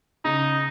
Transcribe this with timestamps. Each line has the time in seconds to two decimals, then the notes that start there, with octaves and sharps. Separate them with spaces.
0.25 C#3 D#4